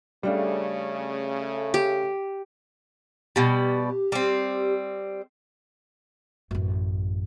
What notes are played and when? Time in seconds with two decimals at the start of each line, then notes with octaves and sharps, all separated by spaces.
0.23 C#3 G3 A3 D4 F5
1.74 G4
3.36 B2 G3 G4
4.12 G3 C4
6.51 A1 F#2